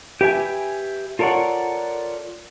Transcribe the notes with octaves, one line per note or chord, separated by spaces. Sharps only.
G4 B4 E5 G#5
F4 A4 A#4 C#5 D5 F#5